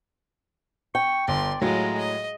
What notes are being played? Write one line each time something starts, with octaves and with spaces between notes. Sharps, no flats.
G5 C#6
G1 D5 C6
A2 F#3 G#3 F4 A#5
D#5